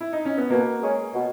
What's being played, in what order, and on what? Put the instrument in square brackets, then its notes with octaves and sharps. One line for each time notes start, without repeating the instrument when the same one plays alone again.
[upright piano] E4
D#4
C#4
B3
[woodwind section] B2 [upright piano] A#3
[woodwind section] G#3 C#4 G#4
B2